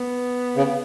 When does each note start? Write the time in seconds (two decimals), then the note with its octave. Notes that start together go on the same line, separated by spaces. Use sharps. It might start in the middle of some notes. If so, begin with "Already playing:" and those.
Already playing: B3
0.57 C#3